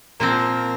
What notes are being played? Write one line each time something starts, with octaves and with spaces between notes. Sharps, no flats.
A#2 F3 C4 A#4